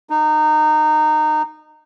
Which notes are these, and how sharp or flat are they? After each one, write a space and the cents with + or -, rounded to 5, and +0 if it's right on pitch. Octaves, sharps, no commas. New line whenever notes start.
D#4 -20